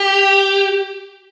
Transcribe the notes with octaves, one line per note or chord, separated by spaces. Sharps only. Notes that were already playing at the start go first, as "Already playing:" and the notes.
Already playing: G4